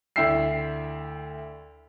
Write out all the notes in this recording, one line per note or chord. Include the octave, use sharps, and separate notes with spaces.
D2 E4 E5 G5 E6 C7